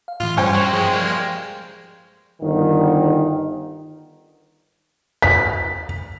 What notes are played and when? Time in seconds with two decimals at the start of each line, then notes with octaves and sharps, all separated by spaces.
0.08 F5
0.20 A2 E3 F4
0.37 G2 G3 C#4 C5 G5 C#6
0.54 F#3
0.73 F3 G#3 A#3 G#4
0.93 G3 A#3
2.41 G1 D#3
5.22 B6